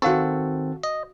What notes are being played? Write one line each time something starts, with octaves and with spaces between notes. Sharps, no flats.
D#3 C4 F#4 A4 F5 F#5 C#6
D#5